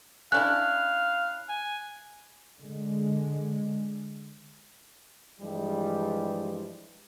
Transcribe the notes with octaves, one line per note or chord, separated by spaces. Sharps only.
C#4 D4 E4 F5 F#6
G#5
D3 G#3
G2 E3 F3 G3 G#3